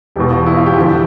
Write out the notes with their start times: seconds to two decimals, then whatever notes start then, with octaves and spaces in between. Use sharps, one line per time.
0.16 E1 E2 B2 G4
0.32 F4
0.46 E4
0.56 F4
0.66 G4
0.76 E2 D3 F3 G4